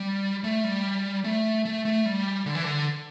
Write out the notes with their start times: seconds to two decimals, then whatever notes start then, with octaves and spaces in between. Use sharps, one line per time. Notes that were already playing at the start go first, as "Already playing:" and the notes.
Already playing: G3
0.44 A3
0.64 G3
1.24 A3
1.65 A3
1.85 A3
2.06 G3
2.46 D3
2.55 E3
2.64 D3